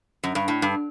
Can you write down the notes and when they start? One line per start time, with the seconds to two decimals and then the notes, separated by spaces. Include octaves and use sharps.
0.24 F#2
0.35 G2
0.48 A2
0.62 G2